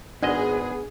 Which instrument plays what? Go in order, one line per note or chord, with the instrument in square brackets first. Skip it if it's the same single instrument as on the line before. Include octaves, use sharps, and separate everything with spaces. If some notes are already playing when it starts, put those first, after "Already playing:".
[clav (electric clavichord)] G#1 G#3 D#5 [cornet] B3 [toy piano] D4 D5 F#5 [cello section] G#4